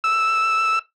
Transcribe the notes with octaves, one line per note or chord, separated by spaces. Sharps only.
E6